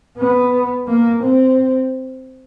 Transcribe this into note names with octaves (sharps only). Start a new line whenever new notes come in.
B3
A#3
C4